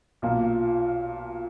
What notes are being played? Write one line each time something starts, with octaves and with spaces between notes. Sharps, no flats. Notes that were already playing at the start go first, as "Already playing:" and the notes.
B1 A#2 A#3